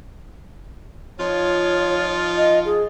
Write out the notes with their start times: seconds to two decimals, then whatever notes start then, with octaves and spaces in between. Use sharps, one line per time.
1.19 F3 D#4 F4 C#5
2.36 D#5
2.65 G#4